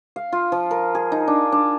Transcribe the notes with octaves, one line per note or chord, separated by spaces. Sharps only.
F5
F4
F3
A#4
G#4
D#4
D4
D4